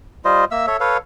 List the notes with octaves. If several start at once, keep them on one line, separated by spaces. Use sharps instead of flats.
G3 F4 C5 D#5
A#3 E5 E6
A4 C#5 E5
A4 B4 C#5 F5